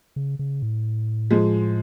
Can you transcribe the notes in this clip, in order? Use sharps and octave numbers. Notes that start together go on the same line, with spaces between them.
C#3
C#3
A2
F3 G#3